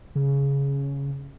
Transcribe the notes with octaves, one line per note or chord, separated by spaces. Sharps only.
C#3